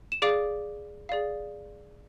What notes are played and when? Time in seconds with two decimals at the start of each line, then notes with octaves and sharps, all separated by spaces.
0.12 E7
0.22 G#4 D5 F5 D6 D7
1.09 G#4 D5 F5